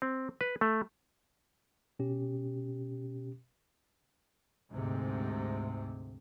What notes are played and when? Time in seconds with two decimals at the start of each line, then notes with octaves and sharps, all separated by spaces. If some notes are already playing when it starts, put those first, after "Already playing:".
0.02 C4
0.41 B4
0.61 A3
1.99 B2 C#4 G4
4.71 D2 G#2 C3